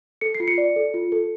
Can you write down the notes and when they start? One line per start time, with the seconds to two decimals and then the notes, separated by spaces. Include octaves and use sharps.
0.21 A4 C#7
0.34 C7
0.40 F4
0.48 C#7
0.58 D5
0.76 A4
0.94 F4
1.12 A4